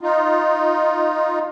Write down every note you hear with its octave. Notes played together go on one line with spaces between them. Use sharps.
D#4 F4